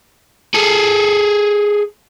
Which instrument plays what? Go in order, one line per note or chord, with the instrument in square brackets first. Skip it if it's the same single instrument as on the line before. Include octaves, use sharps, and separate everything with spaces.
[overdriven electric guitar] G#4 A4